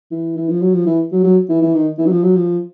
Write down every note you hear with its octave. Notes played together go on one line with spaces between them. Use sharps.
E3
E3
F3
F#3
F3
E3
F#3
F#3
E3
E3
D#3
E3
F#3
F3
F#3
F3